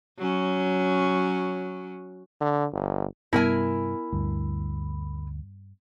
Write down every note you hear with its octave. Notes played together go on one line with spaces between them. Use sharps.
F#3 C#4
D3
G1
G2 C3 G3 B3 E4 A#4 G#5
D2 G2